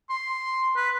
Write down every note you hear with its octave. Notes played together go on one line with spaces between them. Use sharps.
C6
B4